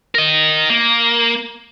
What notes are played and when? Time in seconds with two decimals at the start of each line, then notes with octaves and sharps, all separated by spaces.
0.15 A#4 D#5
0.70 A#3